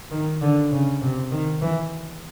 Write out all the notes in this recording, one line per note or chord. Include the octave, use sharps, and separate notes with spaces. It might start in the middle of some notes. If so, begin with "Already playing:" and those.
D#3
D3
C#3
C3
D#3
E3